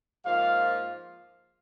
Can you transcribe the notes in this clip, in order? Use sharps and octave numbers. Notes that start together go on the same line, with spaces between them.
G#2 F3 A#3 F4 F5